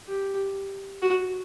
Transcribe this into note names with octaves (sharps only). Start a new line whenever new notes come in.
G4
F#4